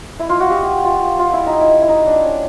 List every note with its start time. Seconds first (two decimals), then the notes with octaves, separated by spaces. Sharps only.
0.19 E4
0.29 F4
0.40 F#4
0.50 G4
0.84 F4
1.19 F4
1.33 E4
1.47 D#4
1.61 E4
1.82 E4
1.89 D#4
2.07 D4
2.24 C#4